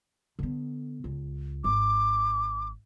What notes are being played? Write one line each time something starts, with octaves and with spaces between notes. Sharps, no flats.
D3 B3
C#2
G#1 D6